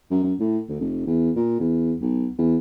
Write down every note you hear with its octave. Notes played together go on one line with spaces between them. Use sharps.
F#2
F#2
A2
D2
F1
E2
A#2
E2
B1
E2